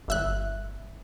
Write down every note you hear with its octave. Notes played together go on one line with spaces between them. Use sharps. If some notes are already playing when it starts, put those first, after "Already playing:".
G1 E5 F#6